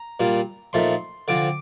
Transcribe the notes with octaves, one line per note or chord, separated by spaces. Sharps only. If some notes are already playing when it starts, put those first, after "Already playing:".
Already playing: A#5
A#2 G3 A#3 F4
A#2 F3 A3 D#4 C6
D3 F3 C4 D6